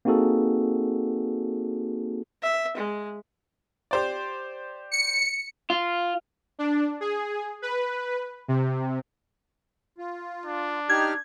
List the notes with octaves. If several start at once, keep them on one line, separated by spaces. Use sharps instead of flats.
A#3 C4 D#4 F#4 G#4 A4
E5
G#3
G4 C5 D5
C#7
F4
D4
G#4
B4
C3
F4
D4
D#4 G4 F6 G#6